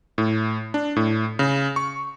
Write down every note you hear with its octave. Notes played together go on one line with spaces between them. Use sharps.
A2
D4
A2
C#3
C#6